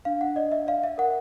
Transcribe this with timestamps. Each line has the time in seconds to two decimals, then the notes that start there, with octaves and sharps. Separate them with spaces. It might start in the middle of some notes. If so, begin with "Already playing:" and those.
0.05 D4 F5
0.21 F#5
0.36 D5 D#5
0.52 E5
0.67 D5 F5
0.84 E5
0.98 A#4 F#5